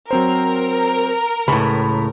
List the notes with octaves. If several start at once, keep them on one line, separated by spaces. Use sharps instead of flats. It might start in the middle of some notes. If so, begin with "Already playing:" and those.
F#3 C4 A#4 C5
C#2 A2 B5